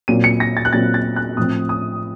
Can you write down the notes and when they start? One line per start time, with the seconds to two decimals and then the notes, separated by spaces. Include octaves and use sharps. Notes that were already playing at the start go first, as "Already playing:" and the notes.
0.08 A#2 F#3 C4 D#7
0.24 C#7
0.40 A#6
0.57 A6
0.65 F#6
0.73 A#2 F#3 C4 A6
0.94 A6
1.16 F#6
1.37 A2 F3 C4 D#6
1.69 D#6